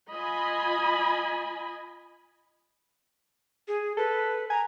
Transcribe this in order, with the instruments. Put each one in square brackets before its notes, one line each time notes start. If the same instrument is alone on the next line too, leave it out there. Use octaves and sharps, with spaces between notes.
[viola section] F4 D#5 G#5 B5
[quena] G#4
[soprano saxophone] A4 [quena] B4
[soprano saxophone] G#5 [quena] A#5